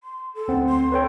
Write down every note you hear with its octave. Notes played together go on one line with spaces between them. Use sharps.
C6
A4
D2 C4 F#5
C6
A4 B4 C#5 G5